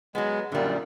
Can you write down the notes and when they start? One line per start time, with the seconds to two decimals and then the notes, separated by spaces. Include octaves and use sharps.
0.15 F#3 G#3 B3
0.52 F#2 A#2 D3 G3